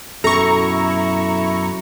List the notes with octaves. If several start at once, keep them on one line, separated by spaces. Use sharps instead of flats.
F#2 B2 E4 A4 A#5 C#6